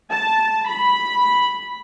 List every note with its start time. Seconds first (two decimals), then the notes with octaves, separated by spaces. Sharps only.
0.11 A5
0.67 B5